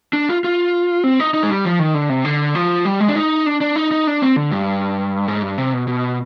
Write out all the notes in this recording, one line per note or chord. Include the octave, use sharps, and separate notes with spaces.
D4
F4
F4
C4
D#4
D#4
G#3
G3
F3
D#3
D3
C3
D3
F3
G3
G#3
D4
D#4
D4
D4
D#4
D#4
D4
C4
D3
G2
G#2
G2
C3
B2
B2